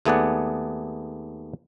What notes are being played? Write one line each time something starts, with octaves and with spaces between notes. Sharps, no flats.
D#2 A3 B3 G#4 D5 F#5